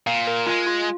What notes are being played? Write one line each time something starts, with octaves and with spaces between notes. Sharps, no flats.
A#2 F5
A#4
G#3 F4
F4